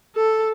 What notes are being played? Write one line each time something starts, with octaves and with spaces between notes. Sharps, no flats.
A4